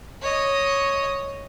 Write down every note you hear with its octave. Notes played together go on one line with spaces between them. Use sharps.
C#5 D#5